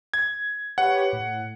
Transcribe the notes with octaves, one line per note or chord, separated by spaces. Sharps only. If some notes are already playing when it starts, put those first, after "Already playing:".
G#6
G4 B4 C#5 F#5
A2